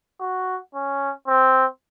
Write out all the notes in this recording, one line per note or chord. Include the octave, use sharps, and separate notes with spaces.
F#4
C#4
C4